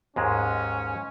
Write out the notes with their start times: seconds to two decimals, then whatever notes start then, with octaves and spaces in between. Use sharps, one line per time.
0.16 D#2 G#2 G#3 C#4